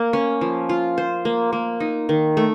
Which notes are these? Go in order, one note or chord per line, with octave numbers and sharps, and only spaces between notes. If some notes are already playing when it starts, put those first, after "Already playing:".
Already playing: A#3
C#4
F3
F4
C5
A#3
A#3
D#4
D#3
A3